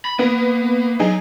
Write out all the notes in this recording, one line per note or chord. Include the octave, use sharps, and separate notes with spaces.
B5
A#3 B3
F#3 D#4 G#4